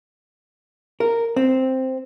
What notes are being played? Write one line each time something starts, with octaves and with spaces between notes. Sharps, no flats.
A#4
C4